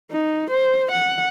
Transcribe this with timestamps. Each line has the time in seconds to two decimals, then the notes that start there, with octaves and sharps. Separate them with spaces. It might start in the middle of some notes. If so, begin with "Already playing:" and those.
0.11 D#4
0.50 C5
0.92 F#5